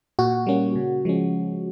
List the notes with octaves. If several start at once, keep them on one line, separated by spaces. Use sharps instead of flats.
A#2 F#4
G3 A#3 C#4
C#3
F3 G#3 C#4